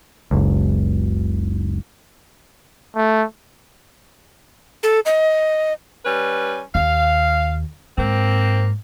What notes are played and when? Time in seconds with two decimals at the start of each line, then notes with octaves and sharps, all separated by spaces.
0.31 F#1 C#2
2.96 A3
4.83 A4
5.06 D#5
6.05 G3 C#4 B4
6.75 D#2 F5
7.98 G#2 A#3 C4